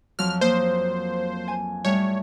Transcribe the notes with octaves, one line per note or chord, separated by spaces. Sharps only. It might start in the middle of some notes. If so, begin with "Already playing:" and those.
F2 F3 F#3 F6
A#3 C5 D#6
G#5
A2 G3 C#5